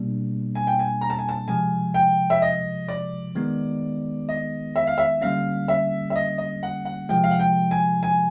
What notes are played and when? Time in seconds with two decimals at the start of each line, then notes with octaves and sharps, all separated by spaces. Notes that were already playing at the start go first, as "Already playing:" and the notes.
Already playing: B2 G3 A#3 D4
0.55 G#5
0.67 G5
0.79 G#5
1.01 A#5
1.10 A5
1.19 G#5
1.29 A5
1.48 C3 F3 G#3 G#5
1.94 G5
2.30 E5
2.42 D#5
2.88 D5
3.35 D#3 G#3 B3 D#4
4.29 D#5
4.76 E5
4.87 F5
4.98 E5
5.21 D3 G3 A#3 C#4 F5
5.68 E5
6.10 E5
6.16 D#5
6.38 D#5
6.63 F#5
6.85 F#5
7.09 C3 F3 G#3 G5
7.24 F5
7.31 F#5
7.39 G5
7.71 G#5
8.03 G#5